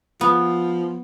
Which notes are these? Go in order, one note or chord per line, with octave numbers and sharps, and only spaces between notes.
F3 B3